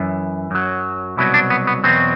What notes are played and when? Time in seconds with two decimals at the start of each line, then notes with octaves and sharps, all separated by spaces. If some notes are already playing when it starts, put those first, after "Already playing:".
Already playing: F#2 E3
0.51 F#2 F#3
1.17 C2 B2 F#3 E4
1.34 D4
1.50 B3
1.67 B3
1.84 E2 B2 F#3 C4